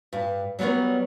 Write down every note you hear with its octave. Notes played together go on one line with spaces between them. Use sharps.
G2
F#3 G3 B3 A#4 C#5